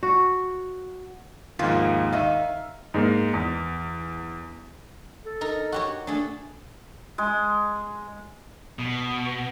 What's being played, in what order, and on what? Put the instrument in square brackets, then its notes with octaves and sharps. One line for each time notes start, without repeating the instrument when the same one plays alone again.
[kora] F#4
[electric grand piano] D#2 G#2 [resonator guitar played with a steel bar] F3 A#3 F4
[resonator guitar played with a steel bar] D#3 D#4 [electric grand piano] E5 F5
[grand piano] G#2 G#3 A#3
E2
[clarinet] A4
[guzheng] D#4 A#4
F#4 G4 C#5
[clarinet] A3 [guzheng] D4 G#4 A4
[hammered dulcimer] G#3
[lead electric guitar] B2